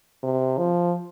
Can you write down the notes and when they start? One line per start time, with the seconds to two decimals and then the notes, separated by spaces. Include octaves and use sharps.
0.23 C3
0.58 F3